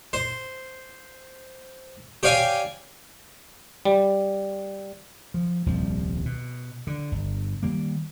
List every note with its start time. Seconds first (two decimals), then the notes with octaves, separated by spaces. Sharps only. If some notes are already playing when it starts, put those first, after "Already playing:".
0.13 C5
2.23 G4 C#5 D5 F5 G#5
3.85 G3
5.34 F3
5.66 D#1 C2 F3
6.25 B2
6.87 D3
7.12 G1
7.63 D#3 G3 A#3